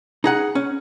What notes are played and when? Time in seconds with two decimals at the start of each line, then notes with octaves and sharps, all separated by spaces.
0.24 D#4 G#4 F#5
0.55 C#4